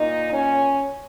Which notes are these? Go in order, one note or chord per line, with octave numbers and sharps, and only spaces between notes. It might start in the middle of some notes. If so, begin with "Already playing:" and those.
Already playing: A#2 A#3 D#4
C#4